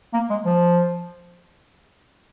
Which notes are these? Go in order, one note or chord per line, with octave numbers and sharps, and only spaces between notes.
A#3
G#3
F3